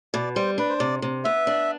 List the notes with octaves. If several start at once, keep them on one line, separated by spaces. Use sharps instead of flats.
B2 D5
G3 C5
D4 B4
C5
C3 D5
C3
B3 E5
D4